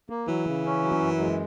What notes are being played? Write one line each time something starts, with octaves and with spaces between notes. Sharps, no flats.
A#3
E3 F#3
C#3
C#4
F#3
F#2
G#3